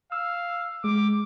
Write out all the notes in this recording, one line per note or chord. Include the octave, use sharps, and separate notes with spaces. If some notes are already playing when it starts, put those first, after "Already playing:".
F5 E6
G#3 D6